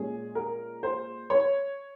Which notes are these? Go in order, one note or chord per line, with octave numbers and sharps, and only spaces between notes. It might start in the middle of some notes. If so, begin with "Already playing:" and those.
Already playing: A#2 G#3 C#4 G#4
A#4
C5
C#5